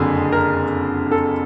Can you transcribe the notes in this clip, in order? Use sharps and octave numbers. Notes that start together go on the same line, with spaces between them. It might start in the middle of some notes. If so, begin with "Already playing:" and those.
Already playing: F#1 F2 D3 F#3 G#4
A#4
A4